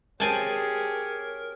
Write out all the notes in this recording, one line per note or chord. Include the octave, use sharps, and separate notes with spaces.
C4 G4 G#4 A#4 C#5 G#5 A5